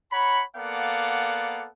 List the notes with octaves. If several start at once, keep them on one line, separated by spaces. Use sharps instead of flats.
C#5 F#5 A#5 B5
A#3 B3 A4 D5 F5 F#5